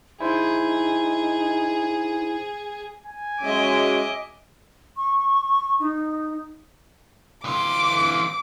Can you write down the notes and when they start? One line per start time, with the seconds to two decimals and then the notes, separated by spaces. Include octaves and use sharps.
0.20 D#4 E4 G#4 C5
3.06 G#5
3.41 F#3 G#3 C#4 D#5 E5 D6
4.97 C#6
5.80 D#4
7.45 E3 F4 D6